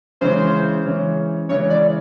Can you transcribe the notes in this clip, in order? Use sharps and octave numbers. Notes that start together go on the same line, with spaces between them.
C#3 E3 G#3 C#4 C5
C#3 E3 G#3 C#4
C#3 E3 G#3 C#4 C#5
D5